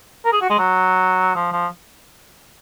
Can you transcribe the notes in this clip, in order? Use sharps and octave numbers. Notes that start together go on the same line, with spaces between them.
A#4
G#4
F#4
G#3
F#3
F3
F3